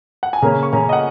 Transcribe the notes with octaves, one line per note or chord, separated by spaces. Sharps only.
F#5
G#5
C#3 A#3 C#4 A#5
C#6
C#3 A#3 C#4 A#5
D#5
F#5